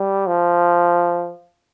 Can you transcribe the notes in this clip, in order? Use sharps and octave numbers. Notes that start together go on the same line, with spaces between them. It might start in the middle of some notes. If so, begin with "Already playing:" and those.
Already playing: G3
F3